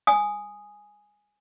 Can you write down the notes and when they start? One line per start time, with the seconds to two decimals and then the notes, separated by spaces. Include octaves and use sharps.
0.07 G#5 D#6